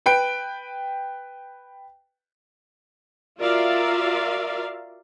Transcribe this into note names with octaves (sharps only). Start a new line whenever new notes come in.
B4 G5 D7
F4 F#4 A#4 D5 E5 F5